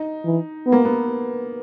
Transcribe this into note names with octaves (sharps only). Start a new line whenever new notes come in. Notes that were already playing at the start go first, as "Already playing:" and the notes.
Already playing: D#4
E3
B3
A#3
B3